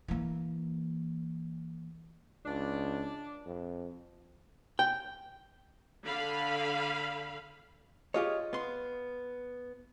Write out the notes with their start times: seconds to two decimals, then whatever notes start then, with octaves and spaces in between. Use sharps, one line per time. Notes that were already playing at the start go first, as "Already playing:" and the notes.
0.08 E3 A#3
2.45 C#2 D4
3.46 F2
4.79 G5
6.05 D3 F5 B5
8.14 F4 G4 G#4 C#5 D#5
8.53 B3 C6